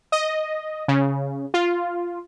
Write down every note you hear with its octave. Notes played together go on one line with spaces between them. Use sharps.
D#5
C#3
F4